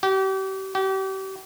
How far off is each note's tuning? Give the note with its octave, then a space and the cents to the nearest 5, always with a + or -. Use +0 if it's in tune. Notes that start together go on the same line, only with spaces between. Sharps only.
G4 -35
G4 -35